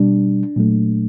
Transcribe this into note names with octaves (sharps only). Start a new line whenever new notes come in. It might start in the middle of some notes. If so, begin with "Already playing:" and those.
Already playing: B2 G3 D4
A#2 F#3 A3